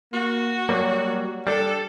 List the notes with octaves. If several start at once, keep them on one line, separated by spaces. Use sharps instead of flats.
A#3 F#4
F#3 G3 A#3 C#5
G3 D4 A4 D5